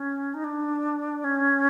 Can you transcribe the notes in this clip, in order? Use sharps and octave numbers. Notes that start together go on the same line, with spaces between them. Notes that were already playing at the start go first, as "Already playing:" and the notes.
Already playing: C#4
D#4
D4
C#4